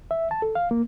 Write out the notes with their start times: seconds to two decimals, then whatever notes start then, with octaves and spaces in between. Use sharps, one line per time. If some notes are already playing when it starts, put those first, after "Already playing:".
0.11 E5
0.31 A5
0.42 A4
0.55 F5
0.71 A#3